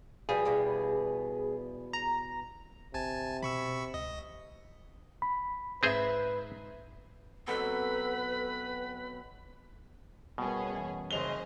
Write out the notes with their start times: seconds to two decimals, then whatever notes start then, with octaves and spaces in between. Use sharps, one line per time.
0.29 B2 F3 G3 G#4
0.45 E2 B2 G3
1.93 A#5
2.94 G1 C3 G#5 A5
3.43 B2 B5 C#6 E6
3.94 C#2 D#5
5.22 B5
5.83 G#2 C4 G#4 B4 C5 E5
7.47 B2 F#3 C4 A4 B4 B5
10.38 B2 G3 B3 C#4 G#4 A#4
10.73 F#2 E3
11.11 F#1 G#4 C5 C#5 D#5 F7 G7